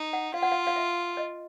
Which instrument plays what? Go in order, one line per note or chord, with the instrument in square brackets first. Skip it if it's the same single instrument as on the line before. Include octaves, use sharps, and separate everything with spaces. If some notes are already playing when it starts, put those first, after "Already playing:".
Already playing: [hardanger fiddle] D#4
[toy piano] F#5
[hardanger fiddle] F4 [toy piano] F5
[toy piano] F#5
F5
F5
E5
D#5